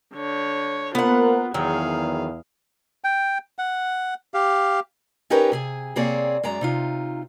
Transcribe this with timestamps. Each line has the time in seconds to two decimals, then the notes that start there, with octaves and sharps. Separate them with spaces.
0.15 D3 C#5
0.95 A#3 B3 F4 A#4 C5 F#5
1.54 E2 D#3 F#3 G#4 F5
3.04 G5
3.58 F#5
4.34 G4 F5
5.30 C#4 D#4 G4 A#4 B4 C#5
5.52 C3 G#4 G#5
5.96 C3 A#3 C4 G#4 C#5 D5
6.43 F#2 G#3 D5 A#5
6.61 C3 D#4 F4